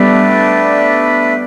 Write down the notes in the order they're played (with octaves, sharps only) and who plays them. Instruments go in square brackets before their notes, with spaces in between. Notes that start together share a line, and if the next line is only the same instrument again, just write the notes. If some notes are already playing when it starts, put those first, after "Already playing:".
Already playing: [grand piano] G3 B3 [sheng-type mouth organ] A3 D4 B4 D5